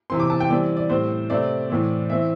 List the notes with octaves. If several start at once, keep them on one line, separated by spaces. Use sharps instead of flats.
C3 E3 C4 C6
D6
A5
G5
E3 G3 C4 D5
D5
A2 G3 C4 C5
C3 A3 C4 D5
A2 E3 C4
E3 C4 E5